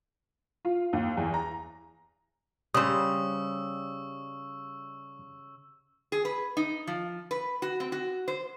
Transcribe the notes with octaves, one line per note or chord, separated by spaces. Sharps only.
F4
D#2
E2
A#5
C#3 G3 C5 C#6 D#6 E6
G#4
B4
D#4
F3
B4
F#4
C4
F#4
C5